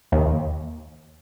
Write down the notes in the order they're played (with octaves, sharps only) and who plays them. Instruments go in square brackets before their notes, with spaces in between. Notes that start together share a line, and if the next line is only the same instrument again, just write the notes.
[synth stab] D#2